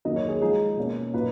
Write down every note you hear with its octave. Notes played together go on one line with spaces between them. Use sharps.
D#3 F#3 A#3 D#5
C#5
G#4
F3 G#3 D#4 G#4
B2 A#3 C#4
A#2 F#3 A#3 D#4 B4